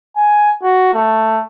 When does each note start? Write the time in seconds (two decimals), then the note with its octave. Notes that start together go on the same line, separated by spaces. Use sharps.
0.16 G#5
0.63 F#4
0.93 A3